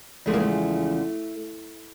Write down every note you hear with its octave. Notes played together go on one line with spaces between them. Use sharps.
E2 C#3 F3 G#3 A3
A#3
A3